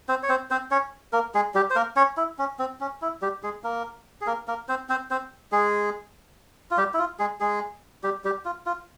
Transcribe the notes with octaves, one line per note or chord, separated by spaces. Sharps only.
C4 C5
C#5
C4 C5
C4 C5
C#4 C#5
A#3 A#4
G#3 G#4
G3 G4
C5
A#3 A#4
C#4 C#5
E4
C#4
C4
C#4
E4
G3 G4
G#3 G#4
A#3 A#4
G#4
A#3 A#4
A#3 A#4
C4 C5
C4 C5
C4 C5
G#3 G#4
F4
G3 G4
E4
F4
G#3 G#4
G#3 G#4
G3 G4
G3 G4
F4
F4